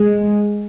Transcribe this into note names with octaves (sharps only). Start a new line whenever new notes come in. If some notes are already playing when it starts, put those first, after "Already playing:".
Already playing: G#3